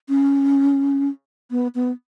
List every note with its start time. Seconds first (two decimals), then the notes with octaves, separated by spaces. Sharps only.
0.09 C#4
1.51 B3
1.75 B3